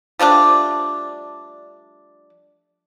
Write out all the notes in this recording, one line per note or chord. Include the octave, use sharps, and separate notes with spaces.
F3 G3 A3 D4